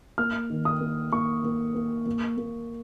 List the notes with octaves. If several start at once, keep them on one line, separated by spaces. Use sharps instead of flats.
A#3 F6
D#3
D#6
A#3
A#3 C#6
A#3
A#3
A#3
A#3